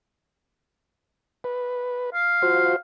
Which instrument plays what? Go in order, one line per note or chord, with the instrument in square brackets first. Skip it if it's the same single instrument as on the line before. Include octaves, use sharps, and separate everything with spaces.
[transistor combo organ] B4
[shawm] F5
[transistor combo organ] F4 F#4 C5